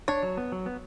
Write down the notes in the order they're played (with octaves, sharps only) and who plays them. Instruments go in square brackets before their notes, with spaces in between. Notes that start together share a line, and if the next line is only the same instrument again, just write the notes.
[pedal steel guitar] D4 [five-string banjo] C#5
[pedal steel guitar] F#3
B3
F#3
B3